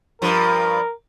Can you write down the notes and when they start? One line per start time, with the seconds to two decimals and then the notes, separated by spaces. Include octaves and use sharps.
0.22 G2 F3 A#4